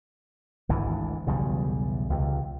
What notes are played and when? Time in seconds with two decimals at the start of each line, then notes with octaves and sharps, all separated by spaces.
0.69 G#1 D2 G#2 E3
1.27 B1 E2 C#3 G3
2.10 C#2 C3